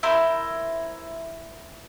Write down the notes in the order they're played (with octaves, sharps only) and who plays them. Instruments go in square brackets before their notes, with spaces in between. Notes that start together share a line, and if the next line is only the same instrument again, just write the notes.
[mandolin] E4 A#4 C5